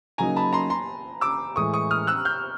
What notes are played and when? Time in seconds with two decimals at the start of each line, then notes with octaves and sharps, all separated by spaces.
0.18 C#3 F#3 A#3 D#4 G#5 A#5
0.36 A5 B5
0.53 A#5 C6
0.70 A#5 C6
1.21 D6 E6
1.56 A2 E3 G#3 C#6 D#6
1.74 C#6 D#6
1.91 D#6 F6
2.07 E6 F#6
2.25 F6 G6